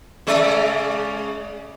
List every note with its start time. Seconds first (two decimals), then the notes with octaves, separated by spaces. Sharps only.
0.27 C#3 G#3 D5